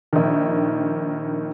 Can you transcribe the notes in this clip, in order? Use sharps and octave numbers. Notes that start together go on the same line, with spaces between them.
A#1 D#3